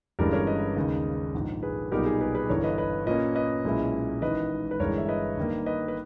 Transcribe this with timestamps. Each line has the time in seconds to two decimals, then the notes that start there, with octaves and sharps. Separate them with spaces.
0.19 G1 G2 E3 G#3 C#4 G4 A#4
0.33 A#4 C#5
0.47 B4 D#5
0.77 D#2 C#3 G#3 D#4
1.34 A#1 G#2 D#3
1.63 G#4 B4
1.92 B1 A#2 G3 B3 D#4 G4 A#4
2.06 G#4
2.20 G#4 B4
2.34 G#4 B4
2.49 G1 G2 E3 A#4 C#5
2.64 B4 D#5
2.78 B4 D#5
3.06 A#2 A#3 C#4 B4 D#5
3.35 B4 D#5
3.64 B1 A#2 G#3 C#4 E4
4.22 G#1 G#2 E3 B4 D#5
4.71 B4
4.80 G1 G2 E3 G#3 A#4 C#5
4.98 E5
5.08 B4 D#5
5.37 G2 D#3 A#3
5.66 B4 D#5
5.88 B4